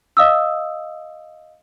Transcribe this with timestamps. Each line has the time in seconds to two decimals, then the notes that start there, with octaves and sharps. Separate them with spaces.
0.17 D#5 F5 D#6 E6